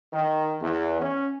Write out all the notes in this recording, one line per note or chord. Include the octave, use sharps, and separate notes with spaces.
D#3
E2
C#4